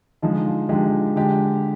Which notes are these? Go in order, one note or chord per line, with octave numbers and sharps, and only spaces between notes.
D3 F3 G#3 D#4
F4
D3 F3 G#3 G4
D3 G#3 G4